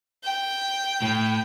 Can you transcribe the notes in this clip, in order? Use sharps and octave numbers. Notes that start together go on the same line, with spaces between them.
G5
A2